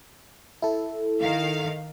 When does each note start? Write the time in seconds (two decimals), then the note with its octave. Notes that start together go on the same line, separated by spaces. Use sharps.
0.62 E4 A4
1.20 D#3 F5